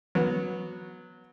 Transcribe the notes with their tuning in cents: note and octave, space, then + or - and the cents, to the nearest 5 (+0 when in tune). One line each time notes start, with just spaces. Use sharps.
F#3 -15 B3 -15